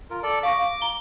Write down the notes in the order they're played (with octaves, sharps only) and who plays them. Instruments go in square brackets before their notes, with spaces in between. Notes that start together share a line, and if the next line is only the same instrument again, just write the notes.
[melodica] F4 A#4
A4 D5
[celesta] F5 C#6 A#6 [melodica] D6
[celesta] F5
A#5 G7